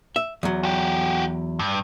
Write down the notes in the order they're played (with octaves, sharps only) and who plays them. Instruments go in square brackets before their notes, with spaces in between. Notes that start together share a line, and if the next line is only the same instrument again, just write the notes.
[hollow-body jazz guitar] E5
E2 F#3
[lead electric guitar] F#4 G4
G2